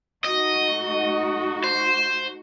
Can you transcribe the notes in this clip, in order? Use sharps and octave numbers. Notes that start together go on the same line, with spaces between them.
A3 D#4 F#4 D#5
C5